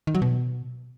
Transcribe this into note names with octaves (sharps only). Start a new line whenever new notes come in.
D#3
F#3
B2